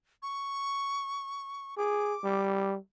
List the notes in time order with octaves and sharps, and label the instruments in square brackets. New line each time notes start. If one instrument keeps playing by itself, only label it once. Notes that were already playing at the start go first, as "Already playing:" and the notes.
[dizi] C#6
[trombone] G#4 [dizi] D6
[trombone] G3